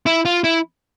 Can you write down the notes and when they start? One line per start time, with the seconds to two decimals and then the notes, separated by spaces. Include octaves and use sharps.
0.06 E4
0.25 F4
0.44 E4